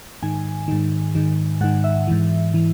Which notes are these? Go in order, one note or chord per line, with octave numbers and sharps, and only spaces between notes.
G#2 D#3 G#5
G#2 D#3
G#2 D#3
G#2 D#3 F#5
E5
G#2 E3
E3